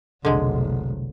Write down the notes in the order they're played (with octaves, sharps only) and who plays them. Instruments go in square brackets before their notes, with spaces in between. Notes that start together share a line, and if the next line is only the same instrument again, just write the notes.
[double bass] F1 B1 [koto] D3 G#3